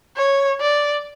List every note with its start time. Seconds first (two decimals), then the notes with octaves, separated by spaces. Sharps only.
0.17 C#5
0.60 D5